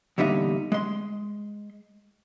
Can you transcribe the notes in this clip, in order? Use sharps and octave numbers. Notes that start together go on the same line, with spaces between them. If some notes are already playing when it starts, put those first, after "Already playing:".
E2 A#2 D3 G3 D#4 E5
G#3 C6